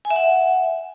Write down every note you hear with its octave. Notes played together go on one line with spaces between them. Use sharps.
G#5
E5
F#5